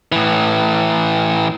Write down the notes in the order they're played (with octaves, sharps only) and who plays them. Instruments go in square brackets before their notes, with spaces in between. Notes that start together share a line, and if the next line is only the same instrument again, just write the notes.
[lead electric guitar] A2 E3